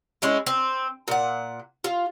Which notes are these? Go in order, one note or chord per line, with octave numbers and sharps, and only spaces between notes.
G#3 C#4 E4
C4
A#2 F#5
F4